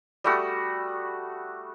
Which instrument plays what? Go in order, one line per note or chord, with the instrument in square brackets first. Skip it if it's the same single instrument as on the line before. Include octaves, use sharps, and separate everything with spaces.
[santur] G3 A3 F#4 D#6